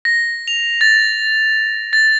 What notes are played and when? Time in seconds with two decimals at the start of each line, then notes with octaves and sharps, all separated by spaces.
0.05 A#6
0.48 F7
0.81 A6
1.93 A6